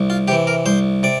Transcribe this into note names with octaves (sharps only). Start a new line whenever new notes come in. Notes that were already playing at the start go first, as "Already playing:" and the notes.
Already playing: C2
F4
C3 E3 G4
A#4
C2 C5
C3 D5